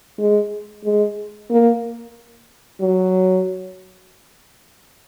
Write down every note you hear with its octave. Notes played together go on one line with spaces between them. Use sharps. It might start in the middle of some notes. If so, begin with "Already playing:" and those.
G#3
G#3
A#3
F#3